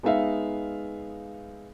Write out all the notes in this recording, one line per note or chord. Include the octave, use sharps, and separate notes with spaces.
G#3 B3 D#4 E5 F5